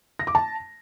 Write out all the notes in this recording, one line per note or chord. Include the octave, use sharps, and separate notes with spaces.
A#6
D6
A5